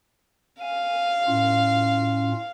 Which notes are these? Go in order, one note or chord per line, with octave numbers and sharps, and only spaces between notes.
F5 G#5
A2 C#4 F4